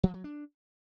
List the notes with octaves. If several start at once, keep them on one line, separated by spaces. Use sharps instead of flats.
F3
F#3
D4